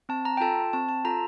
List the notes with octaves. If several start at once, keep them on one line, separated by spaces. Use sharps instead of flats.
C4 A5
A#5
G5
F4 A4 A5
C4 A5
A5
F4 A4 A#5